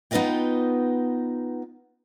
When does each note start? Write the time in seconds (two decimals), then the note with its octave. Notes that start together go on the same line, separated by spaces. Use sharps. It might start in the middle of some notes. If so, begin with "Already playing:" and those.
0.11 B3 D#4 F4 B4 D#5 G5